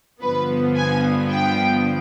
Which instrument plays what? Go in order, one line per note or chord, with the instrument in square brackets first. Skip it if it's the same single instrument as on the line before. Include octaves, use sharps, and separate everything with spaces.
[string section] G2 D3 F3 B3 B4
G#5
G5